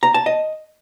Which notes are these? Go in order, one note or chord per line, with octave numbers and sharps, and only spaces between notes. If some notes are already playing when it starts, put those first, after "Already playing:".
A#5
A5
D#5